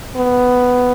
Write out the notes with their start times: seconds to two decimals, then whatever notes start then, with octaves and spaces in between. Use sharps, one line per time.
0.16 B3